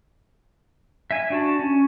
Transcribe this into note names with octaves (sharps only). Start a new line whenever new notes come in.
E5 G#5
D4 F#4 A5
C#4